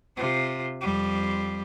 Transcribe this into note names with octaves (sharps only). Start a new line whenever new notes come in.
C3 F4
F2 G3